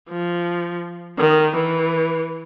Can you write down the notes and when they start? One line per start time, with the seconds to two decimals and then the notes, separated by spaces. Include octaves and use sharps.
0.09 F3
1.18 D#3
1.55 E3